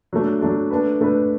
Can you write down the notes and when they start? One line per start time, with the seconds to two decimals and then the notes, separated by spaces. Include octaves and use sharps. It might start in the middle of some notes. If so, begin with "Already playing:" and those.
0.13 F#3 A3 D4
0.41 F#3 A3 D4
0.71 A3 D4 B4
1.01 A3 D4 B4